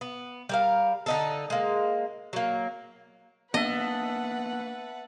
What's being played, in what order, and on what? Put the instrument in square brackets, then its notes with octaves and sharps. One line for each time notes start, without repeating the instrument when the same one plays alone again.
[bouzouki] B3
G3 A#4 F5
D3 D#4 A4
G#3 A#3
F#3 A#3
[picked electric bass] A#3 B3 D4 [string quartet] B4 F#5 [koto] D#5 [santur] E5 A5